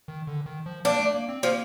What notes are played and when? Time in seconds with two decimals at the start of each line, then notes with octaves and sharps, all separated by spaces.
0.08 D#3
0.27 D3
0.46 D#3
0.66 F3
0.85 A#3 D4
0.99 A3
1.14 A#3
1.29 C4
1.43 F3 A#3